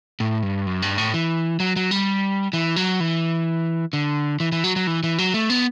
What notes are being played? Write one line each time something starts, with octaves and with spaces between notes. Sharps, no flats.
A2
G2
F#2
G2
A2
E3
F#3
F#3
G3
E3
F#3
E3
D3
E3
E3
F#3
F#3
E3
E3
F#3
A3
B3